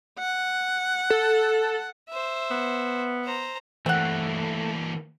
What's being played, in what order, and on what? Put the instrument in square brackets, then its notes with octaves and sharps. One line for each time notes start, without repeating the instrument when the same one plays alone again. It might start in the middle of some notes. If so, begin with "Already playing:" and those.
[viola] F#5
[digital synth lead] A4
[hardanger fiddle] C5 E5
[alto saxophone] B3
[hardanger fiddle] C5 A#5
[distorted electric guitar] E3 A#3 [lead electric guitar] A3 [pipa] C4 F#5